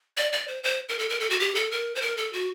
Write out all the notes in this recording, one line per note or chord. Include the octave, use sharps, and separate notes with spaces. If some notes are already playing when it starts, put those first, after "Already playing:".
D5
D5
C5
C5
A#4
A4
A#4
A4
F#4
G4
A4
A#4
C5
A#4
A4
F#4